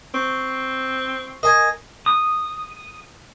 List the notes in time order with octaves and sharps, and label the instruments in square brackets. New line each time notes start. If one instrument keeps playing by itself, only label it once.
[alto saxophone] C4 [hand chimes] C#6
[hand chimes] A#4 G#5 G#6 [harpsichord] D#5
[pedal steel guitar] D#6